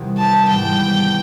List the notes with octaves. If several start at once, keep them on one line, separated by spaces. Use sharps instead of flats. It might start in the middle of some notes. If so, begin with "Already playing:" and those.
Already playing: E2 C3 D#3 G3
A5
G#2 E3 G3 B3 G5